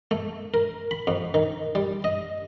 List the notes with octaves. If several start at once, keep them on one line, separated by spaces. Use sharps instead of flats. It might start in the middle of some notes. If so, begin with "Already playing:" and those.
A3
A#4
B5
F2
D#3
G3
D#5